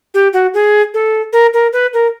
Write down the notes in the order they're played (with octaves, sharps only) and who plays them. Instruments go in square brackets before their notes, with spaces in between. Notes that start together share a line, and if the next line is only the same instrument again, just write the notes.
[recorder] G4
F#4
G#4
A4
A#4
A#4
B4
A#4